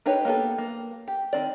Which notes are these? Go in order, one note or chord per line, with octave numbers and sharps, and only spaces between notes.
D4 D#4 G4 B4 C#5
A#3 B3 G4 A4
A#3
G4
D#3 C4 D5